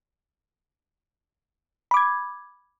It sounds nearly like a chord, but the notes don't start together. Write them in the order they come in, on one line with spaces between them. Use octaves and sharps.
B5 D6 G#6